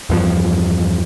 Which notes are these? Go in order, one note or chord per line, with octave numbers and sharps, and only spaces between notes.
E2 G2 F3